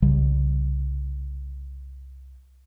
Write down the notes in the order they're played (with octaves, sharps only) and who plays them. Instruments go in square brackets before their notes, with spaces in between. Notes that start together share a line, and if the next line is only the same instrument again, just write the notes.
[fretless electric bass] C2 C#3 G3